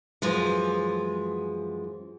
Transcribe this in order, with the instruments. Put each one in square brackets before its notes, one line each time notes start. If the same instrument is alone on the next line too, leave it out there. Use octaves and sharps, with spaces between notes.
[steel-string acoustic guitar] F#2 E3 F3 G#3